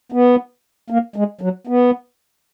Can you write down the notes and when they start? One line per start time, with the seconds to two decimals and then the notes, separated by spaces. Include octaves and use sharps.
0.12 B3
0.90 A#3
1.16 G#3
1.41 F#3
1.67 B3